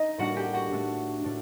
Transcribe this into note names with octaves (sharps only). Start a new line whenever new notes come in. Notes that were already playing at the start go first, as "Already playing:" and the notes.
Already playing: D#4 D#5
A2 G3 A#3 D4 F#4 F#5
G4 G5
F#4 F#5
A2 A3 D4
A2 A3 D4